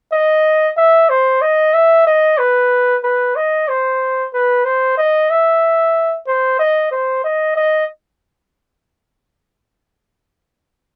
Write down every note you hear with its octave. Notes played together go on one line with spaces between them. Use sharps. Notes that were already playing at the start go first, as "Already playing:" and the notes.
D#5
E5
C5
D#5
E5
D#5
B4
B4
D#5
C5
B4
C5
D#5
E5
C5
D#5
C5
D#5
D#5